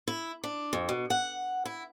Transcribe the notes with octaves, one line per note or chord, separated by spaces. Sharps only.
E4
D4
F2
B2
F#5
E4